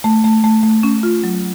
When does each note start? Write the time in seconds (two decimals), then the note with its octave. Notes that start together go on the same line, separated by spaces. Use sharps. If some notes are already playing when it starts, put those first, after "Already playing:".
0.04 A3
0.24 A3
0.44 A3
0.63 A3
0.83 C#4
1.03 F4
1.24 F#3